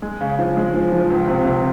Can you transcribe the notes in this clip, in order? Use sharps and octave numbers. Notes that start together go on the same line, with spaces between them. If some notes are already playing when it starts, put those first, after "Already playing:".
G#3
C#3
F3
G#3
F3
F3
C#2
C3
C3